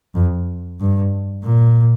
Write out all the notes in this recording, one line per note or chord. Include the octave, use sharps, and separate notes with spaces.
F2
G2
A#2